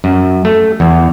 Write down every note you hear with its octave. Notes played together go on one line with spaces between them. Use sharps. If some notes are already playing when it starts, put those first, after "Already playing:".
F#2
A3
E2